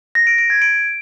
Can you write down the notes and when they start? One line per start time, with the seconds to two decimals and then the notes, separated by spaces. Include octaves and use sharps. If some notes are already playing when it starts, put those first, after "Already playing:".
0.15 A#6
0.27 D7
0.38 D7
0.50 G#6
0.62 D7